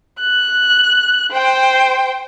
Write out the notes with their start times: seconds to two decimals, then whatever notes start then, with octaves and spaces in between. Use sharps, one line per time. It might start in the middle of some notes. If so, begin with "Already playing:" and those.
0.20 F#6
1.32 C5 G5